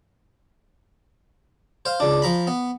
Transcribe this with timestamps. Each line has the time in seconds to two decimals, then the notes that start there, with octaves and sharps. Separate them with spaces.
1.85 C5 F5
2.00 C#2 D4
2.22 F3 A#5 B5
2.47 B3